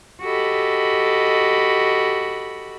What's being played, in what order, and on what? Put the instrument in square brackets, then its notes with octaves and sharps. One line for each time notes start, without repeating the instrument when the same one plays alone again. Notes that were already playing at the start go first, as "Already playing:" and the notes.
[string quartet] F#4 G4 A4 D#5 B5